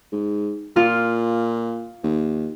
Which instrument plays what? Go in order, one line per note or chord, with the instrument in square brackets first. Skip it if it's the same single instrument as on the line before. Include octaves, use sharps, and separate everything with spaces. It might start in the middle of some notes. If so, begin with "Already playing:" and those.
[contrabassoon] G#2
[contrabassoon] A#2 [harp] F4 F6
[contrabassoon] D#2